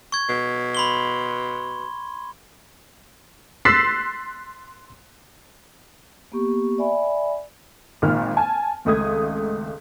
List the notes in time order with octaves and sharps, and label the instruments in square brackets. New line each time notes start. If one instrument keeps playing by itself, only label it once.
[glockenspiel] C#6 G#6
[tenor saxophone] B2
[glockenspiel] B5 C6 G7
[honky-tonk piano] C6 E6 F#6 A6 B6 C7
[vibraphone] A#3 B3 G4 C#6
D5 E5 G#5 B5
[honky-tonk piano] G#1 A#2 D#3 F6
G#5 A5
G#1 C#2 A3 D#6 G#6